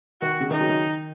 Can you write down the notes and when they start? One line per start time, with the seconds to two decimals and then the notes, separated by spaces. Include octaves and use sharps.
0.21 D#3 F#4
0.40 C#3
0.51 D#3 D#4
0.60 F#3
0.69 D#3